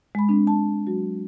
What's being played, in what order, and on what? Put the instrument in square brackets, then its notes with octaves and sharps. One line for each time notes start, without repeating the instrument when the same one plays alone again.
[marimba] G#3 B5
G#3 C4 D4
A5
F#3 F#4